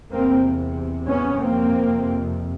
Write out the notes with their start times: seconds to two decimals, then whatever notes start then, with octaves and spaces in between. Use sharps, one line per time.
0.11 E2 C3 A#3 C4
1.08 B3 C#4
1.41 F2 C3 A#3 C4